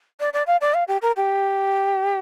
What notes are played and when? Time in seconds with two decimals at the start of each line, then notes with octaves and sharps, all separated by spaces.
0.20 D5
0.33 D5
0.47 F5
0.61 D5
0.74 F5
0.88 G4
1.02 A#4
1.17 G4